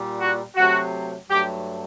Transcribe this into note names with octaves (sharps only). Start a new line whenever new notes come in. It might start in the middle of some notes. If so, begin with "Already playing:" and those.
Already playing: A#2 G3
F#4
C3 F#3 A3 F#4
G2 F#3 A3 G4